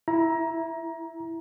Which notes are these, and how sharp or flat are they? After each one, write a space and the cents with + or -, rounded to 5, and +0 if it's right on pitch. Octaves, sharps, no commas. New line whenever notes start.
E4 +0 A#5 +25